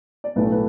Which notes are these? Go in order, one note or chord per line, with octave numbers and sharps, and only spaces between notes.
D5
B1 A2 A3 B4
B4